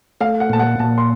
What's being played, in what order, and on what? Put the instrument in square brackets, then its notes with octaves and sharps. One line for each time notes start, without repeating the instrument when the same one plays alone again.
[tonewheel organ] A3 [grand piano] F5
[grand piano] F#5
[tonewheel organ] A#2 [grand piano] A5
[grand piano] F#5
[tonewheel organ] A#2 [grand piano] A5
[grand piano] C6